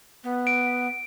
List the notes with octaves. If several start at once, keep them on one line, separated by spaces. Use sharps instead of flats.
B3
D7